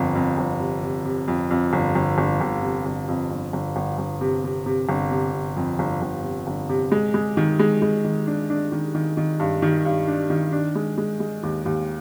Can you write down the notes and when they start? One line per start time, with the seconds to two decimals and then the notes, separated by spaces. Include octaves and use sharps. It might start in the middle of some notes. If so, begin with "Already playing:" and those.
Already playing: G1 F2
0.15 F2
0.38 G1
0.60 C3
0.83 C3
1.05 C3
1.28 F2
1.51 F2
1.73 G1
1.95 G1
2.18 G1
2.41 G1
2.63 C3
2.86 G1
3.08 F2
3.31 G1
3.53 G1
3.76 G1
3.98 G1
4.21 C3
4.44 C3
4.66 C3
4.89 G1
5.11 C3
5.34 C3
5.57 F2
5.79 G1
6.02 G1
6.24 C3
6.47 G1
6.69 C3
6.92 G#3
7.14 G#3
7.37 D#3
7.59 G#3
7.82 G#3
8.04 D#3
8.27 D4
8.50 D4
8.72 D#3
8.95 D#3
9.17 D#3
9.40 G2
9.62 D#3
9.85 G2
10.07 D4
10.30 D#3
10.52 D4
10.75 G#3
10.98 G#3
11.20 G#3
11.43 D#2
11.65 D#2